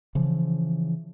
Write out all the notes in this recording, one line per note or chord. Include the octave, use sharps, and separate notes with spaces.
C#3 E3 F3